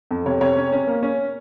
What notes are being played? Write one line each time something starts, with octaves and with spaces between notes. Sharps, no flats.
F2
C3 C#5
C3 C#5
C#4
C#4
A#3
C#4